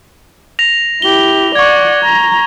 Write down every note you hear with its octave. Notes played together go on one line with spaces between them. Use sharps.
A#6 F7
E4 G4 G7
D5 F#5 C#6 G#6
A#5